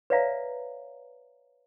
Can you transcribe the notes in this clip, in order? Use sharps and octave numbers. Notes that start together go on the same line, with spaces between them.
B4 C#5 D5 E5 F5 A#5